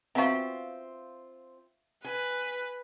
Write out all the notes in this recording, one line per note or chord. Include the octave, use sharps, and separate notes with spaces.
B3 C4 F4 F#4 E5 F5
B4 G#5